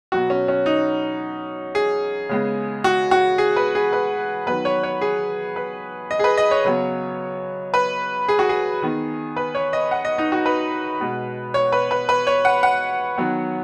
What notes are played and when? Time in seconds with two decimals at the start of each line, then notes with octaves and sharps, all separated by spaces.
0.12 B2 F#3 B3 F#4
0.30 C#4
0.48 C#4
0.66 D#4
1.75 G#4
2.29 C#3 G#3 B3
2.84 F#4
3.11 F#4
3.38 G#4
3.56 B4
3.75 G#4
3.93 B4
4.47 D#3 F#3 B3 B4
4.65 C#5
4.83 C#5
5.01 G#4
5.56 B4
6.11 D#5
6.19 G#4
6.24 B4
6.38 D#5
6.51 C#5
6.65 C#3 F#3 B3
7.74 B4
8.28 G#4
8.39 F#4
8.49 G#4
8.82 D#3 B3
9.36 B4
9.55 C#5
9.73 D#5
9.91 F#5
10.05 D#5
10.18 D#4
10.32 F#4
10.46 B4
11.00 B2 G#3 B3
11.54 C#5
11.72 B4
11.91 B4
12.09 B4
12.27 C#5
12.45 F#5
12.63 F#5
13.17 D#3 F#3 B3